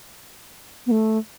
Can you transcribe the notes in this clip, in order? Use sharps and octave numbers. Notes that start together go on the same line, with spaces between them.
B3
A3